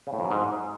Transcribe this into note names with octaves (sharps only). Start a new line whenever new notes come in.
C#3
A2
F2
F#2
G#2